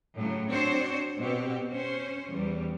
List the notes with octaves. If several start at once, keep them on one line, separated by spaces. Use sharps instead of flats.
A2 C#3 F#3
C4 D4 F#4 C5 C#5
B2 C4 G4
C#4 C5
E2 G3